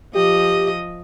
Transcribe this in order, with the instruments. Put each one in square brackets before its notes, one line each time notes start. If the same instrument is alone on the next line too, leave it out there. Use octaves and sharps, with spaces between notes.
[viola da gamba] F3 D#5 [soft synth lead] G4